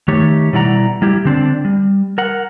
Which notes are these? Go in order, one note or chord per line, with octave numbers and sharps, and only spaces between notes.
D#3 A3 D#4 G4 C#5
B2 G3 E4 D5 F#5 A#5
G3 E4 G4
D3 C4 D4 D5
G3
A#4 F#5